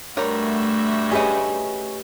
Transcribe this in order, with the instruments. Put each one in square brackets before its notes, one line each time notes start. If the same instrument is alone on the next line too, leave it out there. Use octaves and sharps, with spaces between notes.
[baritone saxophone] G2 [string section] A3 F#4 E5 [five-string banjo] A#4 C#5
[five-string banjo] C#4 G#4 [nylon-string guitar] G4 B4 D#5